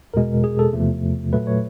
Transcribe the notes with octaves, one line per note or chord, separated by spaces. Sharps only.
E2 B2 G#3 A#4
G#4
A4
E2 C3 F3 A3
A#2 F#3 A3 B4
C#5